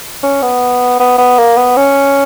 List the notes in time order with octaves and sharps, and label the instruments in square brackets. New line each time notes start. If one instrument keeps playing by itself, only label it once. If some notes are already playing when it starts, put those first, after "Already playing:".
[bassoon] C#4
B3
B3
B3
A#3
B3
C#4